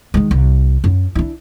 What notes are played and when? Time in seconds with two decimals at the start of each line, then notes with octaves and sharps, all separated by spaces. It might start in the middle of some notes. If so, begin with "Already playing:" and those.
0.14 D#3 G#3
0.31 C2
0.84 F#2
1.15 D4 E4